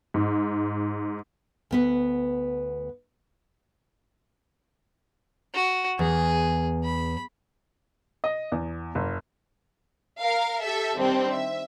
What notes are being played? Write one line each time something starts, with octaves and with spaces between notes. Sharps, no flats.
G#2
D2 B3 B4
F#4
E2 G#4
B5
D#5
E2
F#1
A#4 F5
G4 A4 E5
D#3 G3 C4 D4
E5